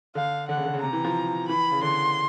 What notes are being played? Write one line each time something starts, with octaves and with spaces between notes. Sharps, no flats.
D3 F5
D3 F#5
C#3
D3
C#3
C3 A#5
E3
F3
E3 B5
C#3
D3 C6